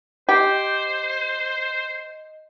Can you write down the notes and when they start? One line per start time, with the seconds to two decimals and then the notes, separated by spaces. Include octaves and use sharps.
0.29 G4 C5 D#5